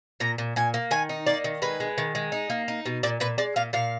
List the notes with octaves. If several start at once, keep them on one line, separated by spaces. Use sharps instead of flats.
A#2 A#5
A#2
A#2 G#5
A#3
D#3 G#5
D#4
A#3 D5
D#3
G#3 B4
G#3
D#3
G#3
D#4
A#3
D#4
B2
A#2 D5
A#2 B4
G#3 D5
A#2 F5
A#2 F5